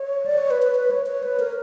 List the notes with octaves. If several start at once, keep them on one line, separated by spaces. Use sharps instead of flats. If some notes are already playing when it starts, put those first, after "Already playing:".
Already playing: C#5
D5
C#5
B4
B4
B4
C#5
C#5
B4
A#4